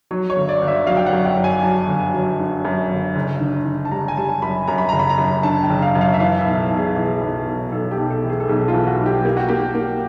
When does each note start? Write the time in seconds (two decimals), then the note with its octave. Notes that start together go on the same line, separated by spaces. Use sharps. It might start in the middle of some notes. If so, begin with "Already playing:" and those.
0.11 F#3 C#5
0.30 C#5
0.36 G1
0.49 D5
0.62 G1
0.68 E5
0.87 F#3 F5
0.97 G5
1.07 F#5
1.12 F#2
1.25 G5
1.38 F#3
1.44 G#5
1.63 F#3 A5
1.88 G1
2.14 F#3
2.40 D3
2.65 F#2
2.91 G1
3.16 F#1
3.40 D3
3.66 D3
3.85 A5
3.91 G3 A#5
4.08 G#5
4.17 G3 A5
4.42 F#2 B5
4.67 F#2 A#5
4.78 B5
4.89 F#1 A#5
4.99 B5
5.09 A#5
5.18 F#2
5.43 D3 A5
5.63 G5
5.70 F#1
5.82 F5
5.95 F#2
6.01 F5
6.14 E5
6.20 E3 F5
6.39 E5
6.45 B1
6.71 B1
6.77 G#4
6.96 E3 G#4
7.21 B1
7.47 B1
7.72 B1 A4
7.91 G4
7.98 B1
8.10 A4
8.23 E3
8.29 G#4
8.40 A4
8.48 B1 G#4
8.68 F4
8.74 E3
8.87 F#4
8.99 B1
9.06 G4
9.25 A#3 G4
9.37 F#4
9.48 A#3 G4
9.75 A#3